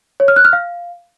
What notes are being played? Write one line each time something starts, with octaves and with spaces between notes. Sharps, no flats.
C#5
F6
F#6
F6
F5